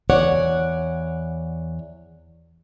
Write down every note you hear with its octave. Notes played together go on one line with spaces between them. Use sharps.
E2 C#5 D5 F#5